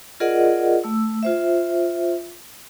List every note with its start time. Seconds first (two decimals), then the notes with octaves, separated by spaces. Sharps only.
0.20 F4 G#4 A#4 D5 D#5 F#5
0.84 A3 E6
1.23 F4 C5 E5